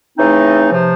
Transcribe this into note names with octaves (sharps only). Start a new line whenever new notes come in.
C#3 E3 A3 C4 D#4
C3 F3